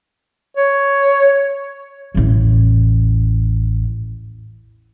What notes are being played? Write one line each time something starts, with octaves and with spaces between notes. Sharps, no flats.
C#5
A1 E2